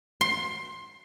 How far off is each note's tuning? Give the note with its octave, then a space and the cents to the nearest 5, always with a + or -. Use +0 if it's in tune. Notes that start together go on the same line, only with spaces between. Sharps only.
C6 +20